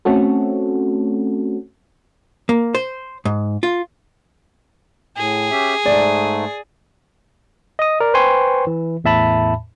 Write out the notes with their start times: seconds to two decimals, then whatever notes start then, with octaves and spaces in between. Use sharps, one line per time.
0.05 A3 C4 C#4 F#4 A4
2.49 A#3
2.75 C5
3.25 G#2
3.63 F4
5.17 A2 G#4
5.51 C#4 G4 E5
5.86 G#2 A3 D5
7.79 D#5 D#6
8.00 A#4 D5
8.14 B4 C5 G5 G#5 C6 C#6
8.67 E3
9.04 E2 A2 E5 A5 B5